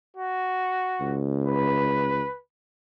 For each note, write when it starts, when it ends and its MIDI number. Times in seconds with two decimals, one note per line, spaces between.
0.17 1.20 66
1.01 2.22 37
1.46 2.38 71